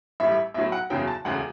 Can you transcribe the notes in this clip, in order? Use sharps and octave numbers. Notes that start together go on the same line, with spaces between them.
A1 A2 G3 E5
E5
B1 A2 F#3 E5
F#5
F#1 E2 C#3 F#3 G5
A5
E1 D2 C#3 F#5